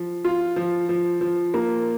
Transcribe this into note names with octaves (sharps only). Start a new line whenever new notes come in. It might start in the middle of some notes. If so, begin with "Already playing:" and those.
Already playing: F3
F4
F3
F3
F3
A#3